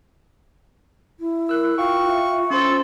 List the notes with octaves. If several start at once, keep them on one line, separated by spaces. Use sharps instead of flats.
E4
A#4 E6 F#6
F4 F5 G5 C#6
E5
C#4 A4 C5 C6